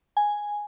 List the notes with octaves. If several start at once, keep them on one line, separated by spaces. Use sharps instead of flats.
G#5